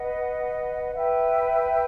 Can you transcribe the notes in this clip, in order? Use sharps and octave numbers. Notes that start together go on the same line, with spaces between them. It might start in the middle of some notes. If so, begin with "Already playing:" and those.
Already playing: B4 D#5 F#5
B4 E5 G5